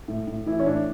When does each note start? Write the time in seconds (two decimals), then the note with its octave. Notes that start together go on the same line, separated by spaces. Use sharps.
0.08 A2
0.27 A2
0.46 E3 E4
0.59 C#4
0.66 A2 D4